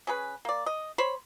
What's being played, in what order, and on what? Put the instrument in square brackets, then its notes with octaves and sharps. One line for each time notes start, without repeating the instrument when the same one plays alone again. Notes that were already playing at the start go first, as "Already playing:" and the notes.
[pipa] C#4 G#4 B4
A#3 D5
D#5
C5 C#5 B5